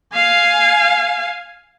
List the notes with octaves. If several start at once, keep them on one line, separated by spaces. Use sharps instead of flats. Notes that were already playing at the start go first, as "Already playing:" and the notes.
F5 G#5